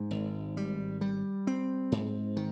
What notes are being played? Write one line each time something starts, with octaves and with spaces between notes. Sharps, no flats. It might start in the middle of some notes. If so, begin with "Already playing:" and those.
Already playing: G#2
G#1
G3
G3
C4
G#2
D#3